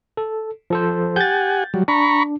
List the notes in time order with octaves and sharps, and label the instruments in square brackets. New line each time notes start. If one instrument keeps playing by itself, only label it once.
[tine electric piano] A4
F3 A4 C5
[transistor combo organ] G4 F#5 G#5 [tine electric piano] G6 A6
[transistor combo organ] F#3 G3
[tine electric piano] D4 [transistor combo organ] A#5 B5 C#6